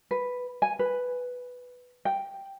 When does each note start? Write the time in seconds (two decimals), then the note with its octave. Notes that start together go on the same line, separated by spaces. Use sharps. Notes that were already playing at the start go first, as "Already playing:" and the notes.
0.11 B4
0.62 G#5
0.79 B4
2.05 G5